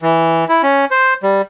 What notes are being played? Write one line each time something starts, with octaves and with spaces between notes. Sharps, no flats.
E3
E4
C#4
C5
G3